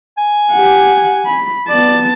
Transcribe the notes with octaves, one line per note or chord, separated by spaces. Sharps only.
G#5
G4 F#5
B5
B3 D5 A5